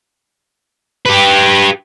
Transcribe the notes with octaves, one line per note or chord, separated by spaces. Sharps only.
G4 B4